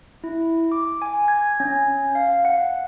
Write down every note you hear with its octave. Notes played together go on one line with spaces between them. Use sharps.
E4
D6
G#5
G#6
C#4
F5
F#5